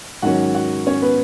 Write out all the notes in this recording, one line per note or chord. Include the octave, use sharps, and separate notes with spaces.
G#2 D#3 F#3 C#4 F#4 F#5
F#4 F#5
C#4 C#5
B3 B4